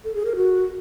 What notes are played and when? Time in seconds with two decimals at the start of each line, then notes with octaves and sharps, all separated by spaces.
0.04 A4
0.15 G#4
0.25 A#4
0.36 F#4